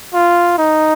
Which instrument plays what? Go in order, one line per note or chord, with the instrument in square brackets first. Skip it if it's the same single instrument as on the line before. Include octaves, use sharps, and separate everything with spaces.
[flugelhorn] F4
D#4